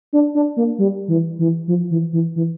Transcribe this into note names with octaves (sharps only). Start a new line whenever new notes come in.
D4
D4
A#3
G3
E3
E3
F3
E3
E3
E3